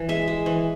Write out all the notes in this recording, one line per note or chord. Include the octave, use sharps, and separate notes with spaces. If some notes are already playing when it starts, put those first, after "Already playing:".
Already playing: E3
G#3 E5
G#3
E3